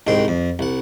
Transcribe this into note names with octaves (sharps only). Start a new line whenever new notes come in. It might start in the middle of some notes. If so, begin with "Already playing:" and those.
C2 G#2 D#3 G5 C6
F2
C2 F#5